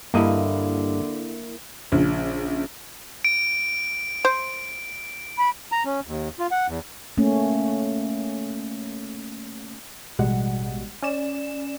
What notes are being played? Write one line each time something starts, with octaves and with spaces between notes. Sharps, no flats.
G2 D3 A#3 E4 D#5
A#1 C#3
D7
C5
B5
A#5
C#4
D#2
F4
F#5
E2
A3 A#3 C#4
A1 B2 G3 G#3 F#5
C#4 D5 E7